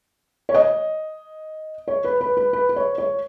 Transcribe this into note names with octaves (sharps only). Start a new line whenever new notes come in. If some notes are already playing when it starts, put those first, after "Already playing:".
C#5
D#5
C#5
B4
B4
B4
B4
B4
C#5
C#5